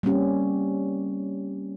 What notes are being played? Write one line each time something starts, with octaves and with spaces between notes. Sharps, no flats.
G3 A#3 C4 C#4 G4